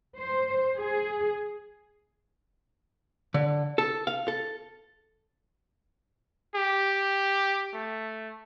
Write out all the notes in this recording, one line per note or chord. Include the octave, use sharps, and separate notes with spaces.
C5
G#4
D3
A4
F5
A4
G4
A3